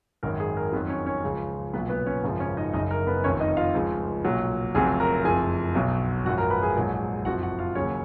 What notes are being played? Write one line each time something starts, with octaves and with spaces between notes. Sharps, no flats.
G#1 F#2 D#3 A#4
G#4
A#4
F2 D#3 F#3 B3 B4
C#4 C#5
C#4 C#5
C#2 C#3 F3
B1 A#2 F#3 B3 B4
B3 B4
C#4 C#5
G#1 F#2 C#3 F3
C#4 C#5
D#4 D#5
F#1 F#2 C#3 D#4 D#5
A#4
B3 B4
F1 F2 D#3 C#4 C#5
D#4 D#5
F4 F5
C#2 C#3 F3
B1 A#2 F#3
F1 F2 C#3 F#3 G#4 G#5
A#4 A#5
F#1 F2 F3 G#4 G#5
B1 B2 F#3
G#1 F#2 F3 F#4 F#5
A#4 A#5
B4 B5
G#4 G#5
A#1 G#2 F#3
F#1 F2 F3 F#4 F#5
F#4 F#5
F4 F5
D#2 C#3 F#3 C#4 C#5